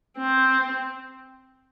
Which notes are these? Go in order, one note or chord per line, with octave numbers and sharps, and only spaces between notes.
C4